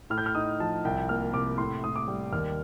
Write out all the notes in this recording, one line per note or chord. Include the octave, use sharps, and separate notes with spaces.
A2 F6
G6
F6
D#4 D#6
F3 A5
C2 G5
A#3 F6
C3 D6
A2 C6
A2 D#6
D6
G3
D#2 F6